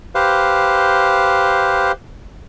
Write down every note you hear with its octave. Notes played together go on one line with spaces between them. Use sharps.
G4 B4 C5 F5